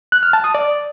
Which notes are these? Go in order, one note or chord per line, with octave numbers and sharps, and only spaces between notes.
F#6
F6
A5
D#6
D5